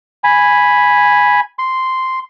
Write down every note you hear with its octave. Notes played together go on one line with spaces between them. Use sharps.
G#5 B5
C6